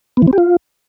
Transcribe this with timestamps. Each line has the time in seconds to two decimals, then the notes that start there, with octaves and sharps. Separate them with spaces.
0.17 B3
0.22 E3
0.28 C4
0.33 G4
0.38 F4